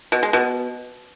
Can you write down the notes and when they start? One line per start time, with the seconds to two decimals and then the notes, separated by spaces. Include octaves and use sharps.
0.12 B2
0.23 G#3
0.33 B2